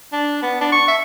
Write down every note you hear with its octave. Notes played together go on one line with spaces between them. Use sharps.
D4
B3
D4
C#6
E5